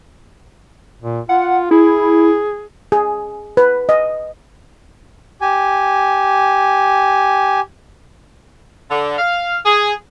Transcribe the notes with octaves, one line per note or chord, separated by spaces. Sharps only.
A#2
F4 F#5
E4 G#4
G#4
B4
D#5
G4 G#5
D3
F5
G#4